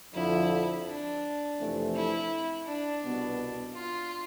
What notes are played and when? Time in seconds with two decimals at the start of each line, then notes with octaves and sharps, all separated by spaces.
0.14 F2 D3 F3 E4
0.86 D4
1.59 F2 C3 E3 A3 C4
1.95 E4
2.67 D4
3.03 C2 B2 B3
3.74 F4